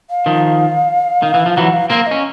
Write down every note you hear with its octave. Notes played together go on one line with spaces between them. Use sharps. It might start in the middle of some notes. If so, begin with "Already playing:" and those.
F5
D#3 F3
D#3
E3
F3
E3 F#3 F#5
F5
A#3 C4 F5
D#5
C#4